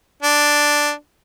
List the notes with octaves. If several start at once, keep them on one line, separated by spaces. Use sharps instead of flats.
D4